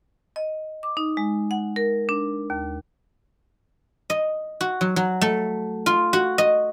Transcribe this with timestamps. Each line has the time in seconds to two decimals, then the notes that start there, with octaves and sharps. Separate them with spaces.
0.36 D#5
0.83 D6
0.97 D#4
1.17 G#3
1.51 F#5
1.76 A#4
2.09 D4
2.50 D#2
4.10 D#5
4.61 F#4
4.81 F#3
4.96 F#3
5.21 A3
5.86 F4
6.13 F#4
6.38 D#5